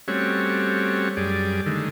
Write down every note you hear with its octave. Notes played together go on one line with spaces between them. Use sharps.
G3 A3 C4 C#4 F#4 C#5
F#2 G3 G#4 D5
D3 D#3 G#3 A3